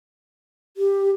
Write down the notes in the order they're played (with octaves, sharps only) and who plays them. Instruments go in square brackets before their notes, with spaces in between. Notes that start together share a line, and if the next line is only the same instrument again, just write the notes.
[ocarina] G4